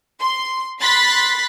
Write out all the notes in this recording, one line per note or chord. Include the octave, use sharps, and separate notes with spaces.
C6
B5 C6 F#6 A6 B6 C7